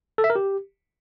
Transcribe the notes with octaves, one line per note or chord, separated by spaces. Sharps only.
A4
E5
A#4
G4